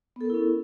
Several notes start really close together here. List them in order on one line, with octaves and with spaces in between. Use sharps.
B3 A4 A#4 E4 C#4